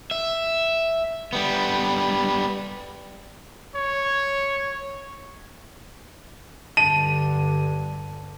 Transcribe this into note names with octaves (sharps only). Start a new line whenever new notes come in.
E5
G3 B3
C#5
G2 D3 A5 D#7